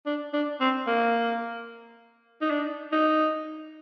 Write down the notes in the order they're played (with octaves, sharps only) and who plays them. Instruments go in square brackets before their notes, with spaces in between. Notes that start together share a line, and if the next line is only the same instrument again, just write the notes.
[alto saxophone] D4
D4
C4
A#3
D#4
D4
D#4